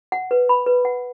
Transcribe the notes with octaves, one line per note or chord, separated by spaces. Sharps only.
F#5
B4
B5
B4
F#5